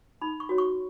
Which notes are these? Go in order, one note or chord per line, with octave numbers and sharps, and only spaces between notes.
D#4 B5
C#6
F#4 C#5
C#6